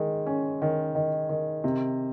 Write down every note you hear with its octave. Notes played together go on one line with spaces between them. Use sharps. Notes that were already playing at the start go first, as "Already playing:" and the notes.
Already playing: D#3 G#3
C#4
D#3
D#3
D#3
C3